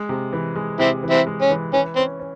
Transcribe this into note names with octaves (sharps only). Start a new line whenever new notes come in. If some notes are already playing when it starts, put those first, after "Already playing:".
Already playing: G#3
C3
E3
G#3
C3 C4 E4
E3
C4 E4
G#3
C#4
E3
E3 C#4
C4 C#4
C#4